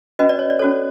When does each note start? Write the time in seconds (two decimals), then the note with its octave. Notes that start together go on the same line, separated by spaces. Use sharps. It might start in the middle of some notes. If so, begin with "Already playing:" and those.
0.19 C#4 F#4 B4 D#5
0.29 D5
0.39 C#5
0.50 D5
0.59 A4 C#5
0.62 C#4 F#4